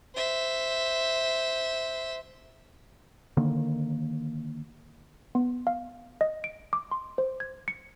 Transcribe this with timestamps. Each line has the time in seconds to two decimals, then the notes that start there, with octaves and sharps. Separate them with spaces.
0.15 C5 E5
3.37 D3 D#3 A#3
5.35 B3
5.67 F5
6.21 D#5
6.44 D7
6.73 D6
6.91 C6
7.18 C5
7.40 G#6
7.68 C#7